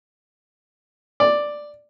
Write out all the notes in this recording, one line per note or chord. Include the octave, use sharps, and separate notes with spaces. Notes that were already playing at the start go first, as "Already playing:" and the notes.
D5